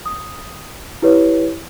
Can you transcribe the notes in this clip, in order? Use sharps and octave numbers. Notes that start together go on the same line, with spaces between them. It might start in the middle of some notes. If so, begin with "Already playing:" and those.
D#6
E4 G4 B4 C#5